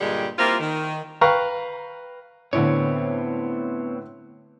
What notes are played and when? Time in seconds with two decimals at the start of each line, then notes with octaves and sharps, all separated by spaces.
0.01 G2 A#2 D3 G3 G#3 G4
0.39 G3 A#3 C4 E4 F4
0.60 D#3
1.21 B4 F5 G5 A#5 C#6
2.53 A2 D3 B3 C4 C#5